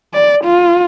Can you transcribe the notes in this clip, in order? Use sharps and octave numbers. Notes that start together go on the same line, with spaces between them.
D5
F4